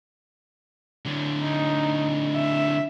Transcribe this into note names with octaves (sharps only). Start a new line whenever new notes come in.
D3 F#3
D#4
E5